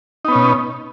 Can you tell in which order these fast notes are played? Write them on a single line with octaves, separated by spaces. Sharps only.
D#4 B3 C#4 B2